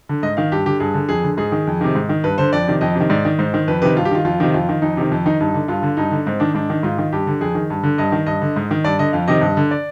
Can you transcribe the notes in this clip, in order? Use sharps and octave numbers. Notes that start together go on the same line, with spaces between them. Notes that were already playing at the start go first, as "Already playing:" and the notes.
D3
G#2 D#5
D#3 F5
G2 G4
D3 G4
G2 G#4
D3
F2 G#4
D3
G#2 G#4
D#3
F2
C3 D#3
G#2
D#3
G2 B4
D3 C5
F2 D5
C3 D#3
F2 D#5
C3 D#3
G#2 D5
D#3
G#2 C5
D#3
F2 B4
C3 D#3 B4
G2 F4
G4
D#3 F4
F2 F4
C3 D#3
F2 F4
D#3
F2 D#4
C3 D#3
F2
D#3 D#4
G2 D#4
D3
G2 F4
D3
G2 D#4
D3
G#2 C4
D#3 D4
G#2 D4
D#3
G#2 F4
D#3
G2 G4
D3
F2 G#4
D#3
G2
D3
G2 D#5
D#3
G2 D#5
D3
G#2
D#3
G2 D5
D3 D#5
F2 F5
C3 D#3 D#5
G2
D3
D5